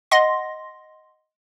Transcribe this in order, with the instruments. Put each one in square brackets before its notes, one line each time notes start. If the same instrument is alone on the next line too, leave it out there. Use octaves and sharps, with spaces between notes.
[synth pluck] D#5 F#5 C6 A#6